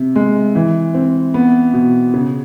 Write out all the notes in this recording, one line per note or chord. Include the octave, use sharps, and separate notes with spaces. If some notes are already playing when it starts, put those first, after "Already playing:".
Already playing: C3
G#3
E3
C4
B3
B2
C#3